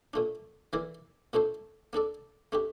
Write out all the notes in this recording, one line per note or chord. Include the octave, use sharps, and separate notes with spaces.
A#2 A3 D4
E3 A#3 E4 A#4 D5
A#2 A3 D4 A4 C5
A#3 D4 A4 D5
A3 D4 G4